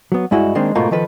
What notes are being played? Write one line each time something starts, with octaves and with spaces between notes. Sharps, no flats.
F#3 B3
G2 G#3 E4 F#4 D#5
D#3 G#3 A#3 C4 D4
G#2 B2 A3 A#3 F4
D#3 F3 A4 B4